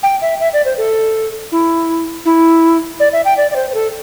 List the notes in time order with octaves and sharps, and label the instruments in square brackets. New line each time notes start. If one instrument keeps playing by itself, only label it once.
[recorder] G5
E5
E5
D5
C5
A4
E4
E4
D5
E5
G5
D5
D5
C5
C5
A4